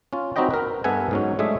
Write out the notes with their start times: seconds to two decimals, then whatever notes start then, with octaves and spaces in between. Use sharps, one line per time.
0.13 C#4 F4
0.36 C4 D#4 F#4 B4 D#5 G5
0.51 A#4 B4
0.84 G2 B3 A4 E5 F#5 G#5
1.11 G#2 F#3 C#4
1.39 G#3 A3 D4 G#4 E5